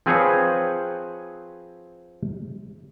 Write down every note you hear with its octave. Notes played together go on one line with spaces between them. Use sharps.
F3 C4 G#4 B4 C#5